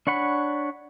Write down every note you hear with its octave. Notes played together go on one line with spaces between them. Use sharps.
D4 C#5 F#5 B5